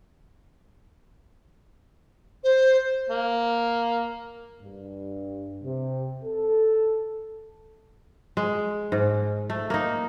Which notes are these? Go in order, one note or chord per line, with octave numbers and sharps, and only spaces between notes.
C5
A#3
G2
C3
A4
G#3
G#2
A3
A#3 D#4